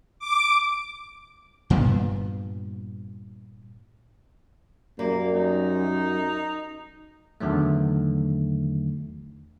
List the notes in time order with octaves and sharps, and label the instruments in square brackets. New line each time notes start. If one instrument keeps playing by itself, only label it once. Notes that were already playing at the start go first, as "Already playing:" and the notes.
[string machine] D6
[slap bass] G2 A#2 G3 B3
[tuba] F#2 [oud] G3 [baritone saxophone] A#3
[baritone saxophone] D#4
[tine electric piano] E2 D3 D#3 F#3 A3